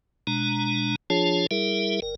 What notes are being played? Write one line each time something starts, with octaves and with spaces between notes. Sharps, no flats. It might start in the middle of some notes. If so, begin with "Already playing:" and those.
B2 G#3 D4 A#5
F3 D4 F4 G#4 C#5 A5
G3 E4 G#4 A#4 E5
G1 A#4